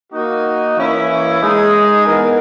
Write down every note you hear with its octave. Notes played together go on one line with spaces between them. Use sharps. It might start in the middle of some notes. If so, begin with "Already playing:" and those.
A#3 D#4 F#4
E3 A#3 C#4 E4
G#3 D#4 G#4
E3 B3 D#4 A#4